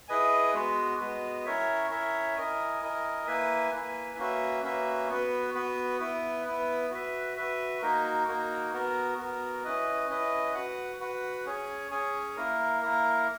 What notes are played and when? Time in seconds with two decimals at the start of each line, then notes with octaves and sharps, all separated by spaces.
0.08 E4 G#4 B4 D#5 G#5
0.54 G#3 B3 F#4 B4
1.00 G#3 B3 F#4 B4
1.45 C#4 E4 A#4 C#5 E5
1.90 C#4 E4 A#4 C#5 E5
2.36 E4 A#4 D#5 G#5
2.82 E4 A#4 D#5 G#5
3.27 A#3 E4 B4 E5 G#5
3.72 A#3 E4 B4 E5 G#5
4.18 A#3 C#4 F#4 B4 E5
4.63 A#3 C#4 F#4 B4 E5
5.09 B3 F#4 B4
5.54 B3 F#4 B4
6.00 B3 E4 B4
6.45 B3 E4 B4
6.91 F#4 B4 E5
7.36 F#4 B4 E5
7.82 A#3 D#4 F#4 A#4
8.27 A#3 D#4 F#4 A#4
8.73 B3 F#4 A#4
9.18 B3 F#4 A#4
9.64 C#4 E4 B4 D#5
10.09 C#4 E4 B4 D#5
10.54 F#4 B4 F#5
11.00 F#4 B4 F#5
11.45 C#4 G#4 C#5 G#5
11.91 C#4 G#4 C#5 G#5
12.36 A#3 E4 A#4
12.82 A#3 E4 A#4